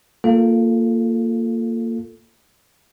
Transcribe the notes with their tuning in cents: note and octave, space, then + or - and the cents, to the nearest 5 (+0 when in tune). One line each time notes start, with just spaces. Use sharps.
A#3 -20 F4 +0 A4 +0